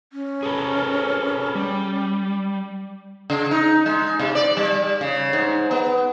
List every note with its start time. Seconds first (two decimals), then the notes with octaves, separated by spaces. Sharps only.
0.13 C#4
0.43 G#4 A4 B4
1.55 G3
3.30 C#3
3.51 D#4
3.86 G#3
4.19 C3
4.35 D5
4.57 G3
5.01 C#3
5.33 G#2
5.71 B3